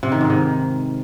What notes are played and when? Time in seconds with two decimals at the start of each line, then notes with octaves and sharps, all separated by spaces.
0.03 C3
0.12 D#3
0.21 G#2
0.30 D#3